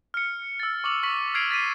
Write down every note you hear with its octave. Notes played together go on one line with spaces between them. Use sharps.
F6 C#7
E6 A6
C#6 D6 F#7
C#6 E6 B6 F#7
F6 G#6 C7 D7 F7
A6 B6 D#7